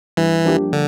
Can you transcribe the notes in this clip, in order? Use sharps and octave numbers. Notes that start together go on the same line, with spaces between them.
G2 E3
F3 A#3 D4 G4
D3